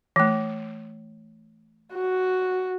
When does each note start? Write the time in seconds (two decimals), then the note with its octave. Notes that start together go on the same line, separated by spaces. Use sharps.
0.16 E3 A3
1.93 F#4